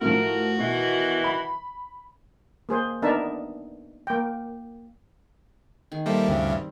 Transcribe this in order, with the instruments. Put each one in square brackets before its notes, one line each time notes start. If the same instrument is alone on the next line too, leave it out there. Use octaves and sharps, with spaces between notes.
[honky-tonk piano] A2 F3 [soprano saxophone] F#4 [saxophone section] A#4
[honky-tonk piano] B2 [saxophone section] D#3 E3
[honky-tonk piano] B5
[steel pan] A#3 G#4 C5
B3 D4 D#4 A#4 E5 A5
A#3 G5
[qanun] D#3 G#4
[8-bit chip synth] G3 A#3 A4 [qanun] C5 D#5 [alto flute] E5
[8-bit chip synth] D2 G2 C#3 [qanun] G3 C4